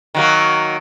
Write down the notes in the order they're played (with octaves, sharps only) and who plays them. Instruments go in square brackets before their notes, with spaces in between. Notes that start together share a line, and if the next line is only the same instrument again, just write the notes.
[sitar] D#3 F#3 A#3